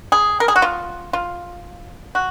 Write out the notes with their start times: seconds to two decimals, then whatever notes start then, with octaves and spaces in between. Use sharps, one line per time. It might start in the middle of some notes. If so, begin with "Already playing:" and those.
0.12 G#4
0.40 A#4
0.48 G#4
0.56 F#4
0.62 F4
1.13 F4
2.15 F#4